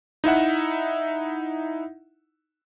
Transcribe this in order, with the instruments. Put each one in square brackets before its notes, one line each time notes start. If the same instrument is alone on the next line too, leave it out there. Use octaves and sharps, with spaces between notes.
[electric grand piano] D#4 E4 E5 F#5